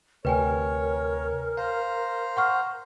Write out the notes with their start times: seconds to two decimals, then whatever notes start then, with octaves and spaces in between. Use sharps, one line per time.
0.25 D2 C3 A#4 B4 C#5 G5 G#5
1.57 C5 F5 A#5
2.37 F#5 C#6 F6